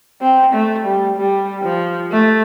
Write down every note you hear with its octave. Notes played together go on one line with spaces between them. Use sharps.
C4
A3
G3
G3
F3
A3